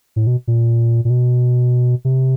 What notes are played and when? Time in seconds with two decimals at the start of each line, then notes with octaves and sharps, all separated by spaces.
0.16 A2
0.27 B2
0.48 A#2
1.05 A#2
1.10 B2
2.05 C3